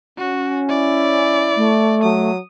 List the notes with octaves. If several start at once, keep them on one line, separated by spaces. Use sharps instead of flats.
C#4 F#4
E4 D5
A3
F#3 D#6